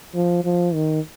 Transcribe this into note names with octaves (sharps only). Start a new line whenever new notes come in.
F3
F3
D#3